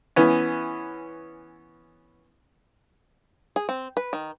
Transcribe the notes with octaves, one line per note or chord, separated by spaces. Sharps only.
E3 B3 C#4
G#4
C4
B4
D#3